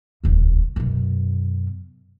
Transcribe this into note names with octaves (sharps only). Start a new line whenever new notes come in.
D#1 C#2
F#2 B2